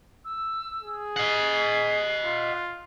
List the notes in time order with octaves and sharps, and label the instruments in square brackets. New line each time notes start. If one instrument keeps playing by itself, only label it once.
[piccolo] E6
[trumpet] G#4
[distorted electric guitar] D#5 F#5 [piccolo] C7
[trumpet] F4